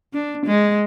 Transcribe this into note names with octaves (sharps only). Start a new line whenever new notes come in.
D4
G#3